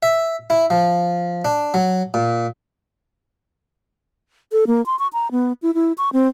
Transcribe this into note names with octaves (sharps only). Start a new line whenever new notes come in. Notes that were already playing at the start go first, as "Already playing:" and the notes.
E5
E4
F3
D4
F#3
A#2
A4
A#3
C6
C#6
A#5
B3
E4
E4
C#6
C4